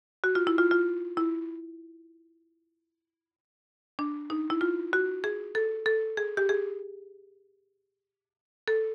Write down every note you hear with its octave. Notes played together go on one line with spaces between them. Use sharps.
F#4
F4
E4
F4
F4
E4
D4
D#4
E4
F4
F#4
G#4
A4
A4
G#4
G4
G#4
A4